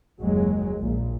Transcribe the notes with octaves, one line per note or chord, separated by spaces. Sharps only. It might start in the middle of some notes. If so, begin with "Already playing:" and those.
F#1 D#2 F#3 G#3
A#1 A#2